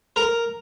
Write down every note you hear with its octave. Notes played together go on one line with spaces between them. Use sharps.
A#4